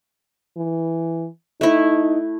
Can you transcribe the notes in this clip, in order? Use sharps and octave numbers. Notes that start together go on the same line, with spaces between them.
E3
A3 D#4 E4